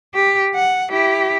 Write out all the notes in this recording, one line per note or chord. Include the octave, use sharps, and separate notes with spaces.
G4
F#5
E4 G4